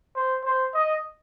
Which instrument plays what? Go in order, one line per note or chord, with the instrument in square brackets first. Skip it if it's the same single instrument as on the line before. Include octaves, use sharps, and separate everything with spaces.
[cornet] C5
C5
D#5